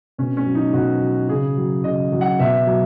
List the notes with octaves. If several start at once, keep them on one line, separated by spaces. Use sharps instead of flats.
B2 C#4
C#4
F#3
D#4
B2 F#4
F#3
C#3 G#4
F#3
C#3 D#5
F#3
F#5
B2 E5
F#3